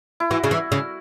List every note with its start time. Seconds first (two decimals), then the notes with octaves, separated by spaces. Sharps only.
0.20 E4
0.30 E3 F#4
0.44 C#3
0.51 E3
0.72 C#3